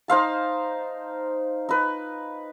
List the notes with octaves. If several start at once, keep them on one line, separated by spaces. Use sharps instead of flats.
D#4 C5 F5 A5
D#4 B4